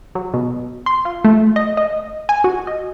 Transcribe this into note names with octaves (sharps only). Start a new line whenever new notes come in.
F#3
B2
C6
F4
A3
D#5
D#5
G#5
F#4
D#5